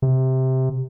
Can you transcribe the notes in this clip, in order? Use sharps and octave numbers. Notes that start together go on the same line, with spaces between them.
C3